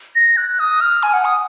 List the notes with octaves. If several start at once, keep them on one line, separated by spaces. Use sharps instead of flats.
A#6
F#6
D#6
F6
G#5
F#5
D#6